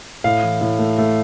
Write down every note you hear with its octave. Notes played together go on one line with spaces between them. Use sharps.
A2 F5
E3
A2
A3
A3